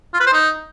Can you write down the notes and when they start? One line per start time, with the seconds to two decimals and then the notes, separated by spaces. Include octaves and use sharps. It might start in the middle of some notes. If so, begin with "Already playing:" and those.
0.14 F4
0.20 B4
0.27 C5
0.33 D#4